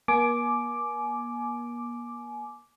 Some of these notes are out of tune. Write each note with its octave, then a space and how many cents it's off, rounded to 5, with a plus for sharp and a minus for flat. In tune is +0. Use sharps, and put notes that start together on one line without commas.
A#3 +40 G#5 +30 D6 +0